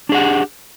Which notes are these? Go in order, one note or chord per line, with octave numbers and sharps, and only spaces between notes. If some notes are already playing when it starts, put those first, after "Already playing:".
D4 G4 G#4 F#5